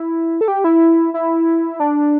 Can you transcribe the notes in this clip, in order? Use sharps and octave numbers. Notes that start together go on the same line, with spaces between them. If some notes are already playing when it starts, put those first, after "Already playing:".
Already playing: E4
A4
G4
E4
E4
D4